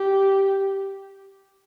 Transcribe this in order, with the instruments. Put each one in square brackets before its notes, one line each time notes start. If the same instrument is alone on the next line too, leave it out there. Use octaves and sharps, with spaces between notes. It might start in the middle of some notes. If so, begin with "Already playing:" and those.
Already playing: [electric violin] G4